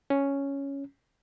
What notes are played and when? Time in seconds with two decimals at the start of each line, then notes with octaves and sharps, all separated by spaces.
0.10 C#4